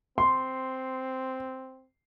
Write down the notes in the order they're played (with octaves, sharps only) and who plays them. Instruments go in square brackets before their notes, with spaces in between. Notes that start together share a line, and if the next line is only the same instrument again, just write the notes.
[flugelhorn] C4 [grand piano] C6